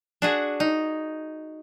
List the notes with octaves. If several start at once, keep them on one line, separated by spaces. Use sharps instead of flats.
D4 F#4 G#4
D#4